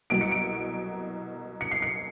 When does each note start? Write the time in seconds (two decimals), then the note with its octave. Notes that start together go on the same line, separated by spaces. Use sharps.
0.10 C2 B2 F#3 D7
0.21 C#7
0.31 D7
1.61 C#7
1.71 C7
1.82 C#7